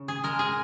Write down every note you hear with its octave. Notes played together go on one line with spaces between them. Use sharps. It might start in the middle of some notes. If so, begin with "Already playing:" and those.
Already playing: C#3
G#4
G#3 A#4
G#4